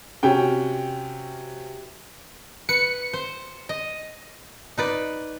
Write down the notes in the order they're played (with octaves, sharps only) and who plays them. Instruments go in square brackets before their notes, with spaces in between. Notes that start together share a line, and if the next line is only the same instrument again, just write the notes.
[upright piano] C3 C#4 F#4 G5
[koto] B4 [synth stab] C#7
[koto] C5
D#5
D#4 B4 D5